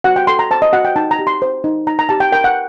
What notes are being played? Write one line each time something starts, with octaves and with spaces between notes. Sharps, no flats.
F#4 F#5
G5
A4 C6
A#5
C5 A5
D#5
F#4 F#5
G5
D#4 A5
A#5
G4
C6
C5
D#4
D#4 A#5
A#5
G4 A5
G5
A#4 G5
F#5